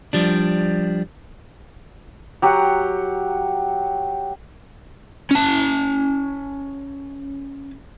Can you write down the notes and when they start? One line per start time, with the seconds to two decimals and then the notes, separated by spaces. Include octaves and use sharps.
0.13 F3 G3 D4
2.42 F#3 G4 F#5
5.31 C#4 A5